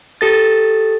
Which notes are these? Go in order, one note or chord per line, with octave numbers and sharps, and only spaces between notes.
G4 A4 A6